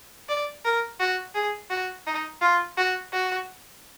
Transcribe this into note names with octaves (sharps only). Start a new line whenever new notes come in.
D5
A#4
F#4
G#4
F#4
D#4
F4
F#4
F#4